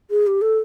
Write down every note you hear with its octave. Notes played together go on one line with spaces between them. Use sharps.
G#4
G4
A4